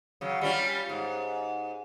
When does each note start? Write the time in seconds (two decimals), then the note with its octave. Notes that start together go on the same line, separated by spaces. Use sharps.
0.21 C#3 F#3
0.41 G3 C#4 F4
0.89 G#2